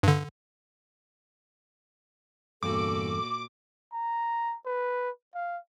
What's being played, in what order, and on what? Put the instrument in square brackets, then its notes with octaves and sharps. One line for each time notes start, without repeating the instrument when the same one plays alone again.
[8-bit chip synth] G2 D3
[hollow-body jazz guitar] E2 G2 [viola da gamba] A#2 F#4 [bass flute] A4 [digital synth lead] D6
[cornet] A#5
B4
F5